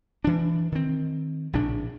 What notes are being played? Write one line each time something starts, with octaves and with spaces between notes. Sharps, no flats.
E3 D4
D#3 C4
A#1 A2 C#3 D4